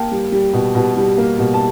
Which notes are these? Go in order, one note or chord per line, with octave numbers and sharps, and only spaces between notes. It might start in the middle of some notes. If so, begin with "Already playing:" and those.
Already playing: A#3 G5 A5
G3
G3
B2
B2
G3
A#3
B2
A5